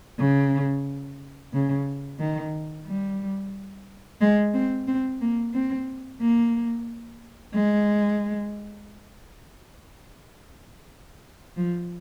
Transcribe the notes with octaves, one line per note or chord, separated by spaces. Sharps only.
C#3
C#3
D#3
G3
G#3
C4
C4
A#3
C4
A#3
G#3
F3